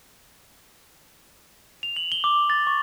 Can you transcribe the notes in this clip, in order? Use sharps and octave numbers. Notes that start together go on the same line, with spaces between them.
F7
F#7
G7
D6
A6
C#6